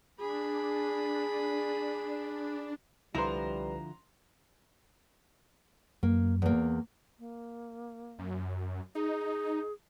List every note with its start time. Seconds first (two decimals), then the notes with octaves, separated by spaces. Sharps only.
0.19 D4 G#4 B5
3.15 C2 D3 F3 G3 E4 B4 A#5 C6
6.03 F#2 A#3
6.42 E2 A#3
7.19 A#3
8.19 F#2
8.95 D#4 G#4